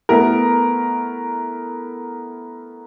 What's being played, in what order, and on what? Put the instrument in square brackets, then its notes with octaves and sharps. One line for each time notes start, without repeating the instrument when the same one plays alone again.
[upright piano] A3 B3 E4 A#4